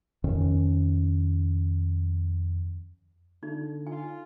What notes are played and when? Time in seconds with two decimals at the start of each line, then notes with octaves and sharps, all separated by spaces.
0.24 F2 D#3 C#4
3.43 D3 D#4
3.87 F4 G#5